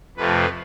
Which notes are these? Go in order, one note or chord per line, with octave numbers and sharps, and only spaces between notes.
F2 C3 F3 A3 B4